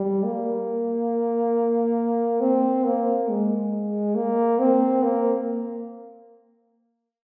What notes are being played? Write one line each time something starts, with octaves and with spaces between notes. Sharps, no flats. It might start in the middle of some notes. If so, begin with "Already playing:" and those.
Already playing: G3
A#3
C4
A#3
G#3
A#3
C4
A#3